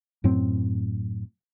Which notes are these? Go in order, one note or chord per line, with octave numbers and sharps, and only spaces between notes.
F#2 A2 F#3 C4